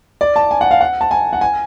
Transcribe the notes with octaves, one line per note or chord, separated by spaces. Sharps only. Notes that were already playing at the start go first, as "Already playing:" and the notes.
D5
A5
G#5
F#5
F5
F#5
A5
G#5
F#5
G#5